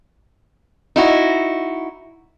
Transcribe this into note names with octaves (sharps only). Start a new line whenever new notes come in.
D#4 E4 F#4